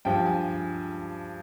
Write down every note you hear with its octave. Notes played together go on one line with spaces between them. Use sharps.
G2 F3 G5
G#5